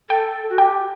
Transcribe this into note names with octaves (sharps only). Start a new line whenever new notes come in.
A4 G5
F#4
G4 G5